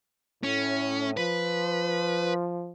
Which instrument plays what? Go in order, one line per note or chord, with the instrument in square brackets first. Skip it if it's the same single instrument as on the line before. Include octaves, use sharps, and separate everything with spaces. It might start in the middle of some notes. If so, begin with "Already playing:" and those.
[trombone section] A2 [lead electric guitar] C#4
[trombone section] F3 [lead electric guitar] B4